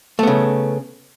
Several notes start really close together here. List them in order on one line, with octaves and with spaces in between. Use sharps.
A3 B3 C#3